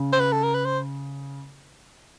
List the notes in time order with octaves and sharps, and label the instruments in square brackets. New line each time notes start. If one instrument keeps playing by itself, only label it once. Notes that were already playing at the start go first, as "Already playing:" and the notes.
Already playing: [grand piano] C#3
[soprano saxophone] C5
B4
A4
A#4
B4
C5